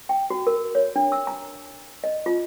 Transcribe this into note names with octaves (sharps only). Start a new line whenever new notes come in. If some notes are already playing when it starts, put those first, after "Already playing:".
G5
F#4
A#4
C#5
D4
E6
A#5
D#5
F4